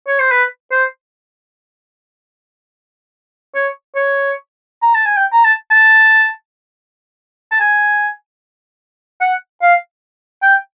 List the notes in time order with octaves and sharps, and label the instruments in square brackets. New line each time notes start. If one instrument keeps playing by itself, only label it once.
[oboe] C#5
C5
B4
C5
C#5
C#5
A#5
A5
G#5
G5
A#5
A5
A5
A5
G#5
F#5
F5
G5